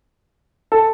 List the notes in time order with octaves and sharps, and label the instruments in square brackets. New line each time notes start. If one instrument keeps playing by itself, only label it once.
[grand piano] A4